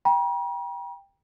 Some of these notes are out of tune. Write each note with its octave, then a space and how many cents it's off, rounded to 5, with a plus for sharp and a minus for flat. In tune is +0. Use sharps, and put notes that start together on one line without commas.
G5 +10 A#5 +45